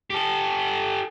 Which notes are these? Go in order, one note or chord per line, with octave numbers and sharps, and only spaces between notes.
G4 A4